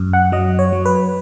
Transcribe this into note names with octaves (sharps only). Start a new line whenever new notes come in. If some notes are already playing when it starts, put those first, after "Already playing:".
Already playing: F#2
F#5
F#3 D#5
C#5
F#3
B4